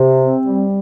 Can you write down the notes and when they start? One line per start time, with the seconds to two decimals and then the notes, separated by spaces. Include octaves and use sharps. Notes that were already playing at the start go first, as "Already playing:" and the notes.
Already playing: C3
0.20 C4
0.47 G3